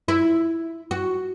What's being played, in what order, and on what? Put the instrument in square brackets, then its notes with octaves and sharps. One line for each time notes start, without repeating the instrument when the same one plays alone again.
[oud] E4
F#4